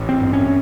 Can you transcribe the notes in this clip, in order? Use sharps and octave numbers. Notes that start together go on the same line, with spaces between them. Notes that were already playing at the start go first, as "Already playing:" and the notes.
Already playing: A1
C4
G2
C#4